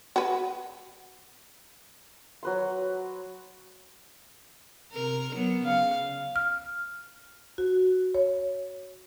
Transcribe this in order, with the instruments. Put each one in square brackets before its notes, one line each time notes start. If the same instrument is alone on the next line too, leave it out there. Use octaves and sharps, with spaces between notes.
[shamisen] F#4 B4
[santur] F#3 B4 C6
[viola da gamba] C3 A#4
F#3 B3
[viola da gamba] C#3 [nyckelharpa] F5
[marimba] F6
F#4
C#5